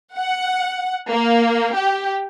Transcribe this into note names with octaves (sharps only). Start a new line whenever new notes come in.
F#5
A#3
G4